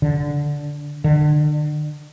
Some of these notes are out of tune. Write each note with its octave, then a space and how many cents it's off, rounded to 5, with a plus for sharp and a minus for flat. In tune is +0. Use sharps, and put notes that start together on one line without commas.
D3 -10
D3 +35